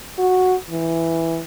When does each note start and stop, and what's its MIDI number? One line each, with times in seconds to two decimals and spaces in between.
0.18 0.55 66
0.70 1.41 52